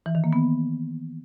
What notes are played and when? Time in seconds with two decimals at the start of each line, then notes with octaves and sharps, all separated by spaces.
0.06 E3
0.15 D#3
0.24 A#3
0.33 B3